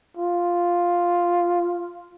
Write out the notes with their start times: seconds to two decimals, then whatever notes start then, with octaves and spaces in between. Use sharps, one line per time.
0.17 F4